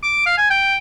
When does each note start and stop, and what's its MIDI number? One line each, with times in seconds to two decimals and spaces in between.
0.03 0.25 86
0.26 0.33 77
0.38 0.48 80
0.50 0.78 79